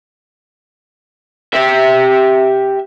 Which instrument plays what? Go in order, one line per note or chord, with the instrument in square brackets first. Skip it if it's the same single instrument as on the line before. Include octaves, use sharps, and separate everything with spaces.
[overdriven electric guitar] G4 E5